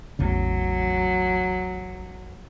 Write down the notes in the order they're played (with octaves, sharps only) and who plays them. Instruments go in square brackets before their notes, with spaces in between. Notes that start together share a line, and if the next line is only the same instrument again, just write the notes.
[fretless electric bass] A1 E2 C#3 [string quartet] F#3